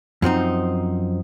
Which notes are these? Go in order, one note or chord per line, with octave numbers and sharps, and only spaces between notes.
F#2 F3 C4 D#4